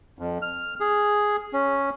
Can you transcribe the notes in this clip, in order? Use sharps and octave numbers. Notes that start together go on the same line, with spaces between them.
F2
F6
G#4
C#4